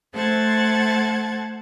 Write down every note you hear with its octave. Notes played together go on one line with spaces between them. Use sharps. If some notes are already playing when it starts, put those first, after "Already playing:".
A3 C5 F#5 A5 G#6 A6